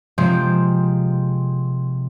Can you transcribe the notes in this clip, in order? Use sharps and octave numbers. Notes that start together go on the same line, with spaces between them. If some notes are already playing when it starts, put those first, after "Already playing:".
C3 F3 G#3 C4